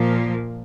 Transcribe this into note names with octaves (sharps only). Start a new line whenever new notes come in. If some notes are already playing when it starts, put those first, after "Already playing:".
Already playing: A#2 F3 A#3